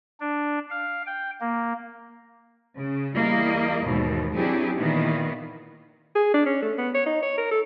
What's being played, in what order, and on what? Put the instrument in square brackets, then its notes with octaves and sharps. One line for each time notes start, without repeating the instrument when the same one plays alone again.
[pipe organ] D4
F5
G5
A#3
[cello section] C#3
E2 G3 A#3 E4 D#5
D#2 G#2 B2 E3
F#3 C4 D4 E4 G4 G#4
A#2 D#3 E3 A#3 B3
[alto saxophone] G#4
D4
C#4
A3
B3
C#5
D#4
C#5
A#4
A4